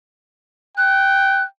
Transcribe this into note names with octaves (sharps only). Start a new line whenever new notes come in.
G5 F#6